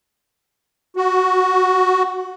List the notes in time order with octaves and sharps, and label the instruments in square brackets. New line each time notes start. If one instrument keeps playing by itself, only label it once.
[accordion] F#4